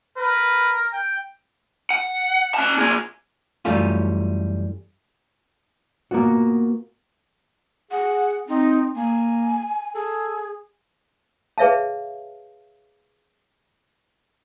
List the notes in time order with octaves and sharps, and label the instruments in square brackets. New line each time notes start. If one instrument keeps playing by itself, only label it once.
[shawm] A#4 [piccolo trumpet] B4
[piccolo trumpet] G5
[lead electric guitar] F#5
C#4 A5
A#2 G#4
[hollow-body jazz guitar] F#2 E3 G3 A3 C#4 F4
A#3 B3 F4 F#4
[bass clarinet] G#4 [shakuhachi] F#5
[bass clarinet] C4 [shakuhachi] D#4
[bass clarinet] A#3 [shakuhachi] G#5
[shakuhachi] G#4 [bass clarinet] A4
[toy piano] G#4 B4 C#5 E5 F5 A5